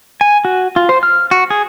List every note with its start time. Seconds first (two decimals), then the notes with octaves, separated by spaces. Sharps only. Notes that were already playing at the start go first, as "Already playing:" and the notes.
0.21 G#5
0.45 F#4
0.76 F4
0.89 C5
1.03 F6
1.31 F#4
1.50 G#4